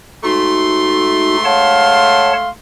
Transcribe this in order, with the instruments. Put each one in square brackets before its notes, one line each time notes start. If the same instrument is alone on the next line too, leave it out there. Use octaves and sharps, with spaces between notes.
[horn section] G#2 A3 C6 [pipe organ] D#4 F#4
[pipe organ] C#5 F#5 A5 [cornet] F5